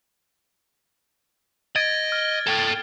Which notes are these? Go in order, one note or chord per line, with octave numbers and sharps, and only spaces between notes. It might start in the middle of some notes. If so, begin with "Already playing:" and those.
D#5 G#6 A6 D7
F6 G7
A4 G5